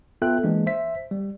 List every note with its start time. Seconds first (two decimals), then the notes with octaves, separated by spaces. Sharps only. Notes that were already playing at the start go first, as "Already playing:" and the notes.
0.22 B3 F4 A4 E5 G5 F#6
0.43 E3 G#3 A#3 D4
0.67 C5 E5 B6
1.11 G3